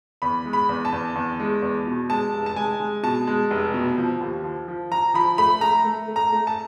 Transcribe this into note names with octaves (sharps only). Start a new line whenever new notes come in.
E2 B5
G#3
B5
E2
A5
E2
E2
G#3
E2
B2
G#3 A5
F1
A5
G#3 G#5
G#3
B2 A5
G#3
F1
B2
F3
D#2
F3
F3
F3 A#5
F3 B5
A3 B5
A3 A#5
A3
A3
A#5
A3
A5